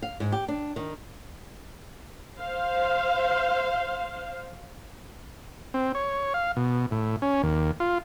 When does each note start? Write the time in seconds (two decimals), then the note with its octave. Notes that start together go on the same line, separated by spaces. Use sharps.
0.02 F5
0.20 G#2
0.32 G4
0.48 D4
0.76 D#3
2.38 C5 F5
5.74 C4
5.95 C#5
6.34 F5
6.57 B2
6.91 A2
7.22 C#4
7.43 D#2
7.80 F4